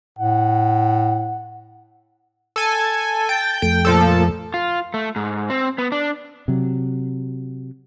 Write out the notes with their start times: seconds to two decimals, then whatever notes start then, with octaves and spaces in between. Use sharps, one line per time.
0.19 A2 F#5
2.56 A4 G#5
3.29 G5 A5
3.62 F2 A3 G5
3.85 A#2 F3 A4
4.54 F4
4.94 A3
5.16 G#2
5.50 C4
5.78 B3
5.92 D4
6.48 C3 F#3